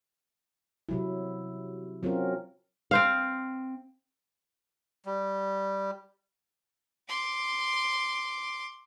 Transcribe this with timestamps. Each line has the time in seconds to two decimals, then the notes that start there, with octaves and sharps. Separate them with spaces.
0.89 C3 F#3 E4
2.03 F#3 C4 C#4 F4 F#4 A#4
2.91 C4 C5 F5
5.05 G3
7.09 C6 D6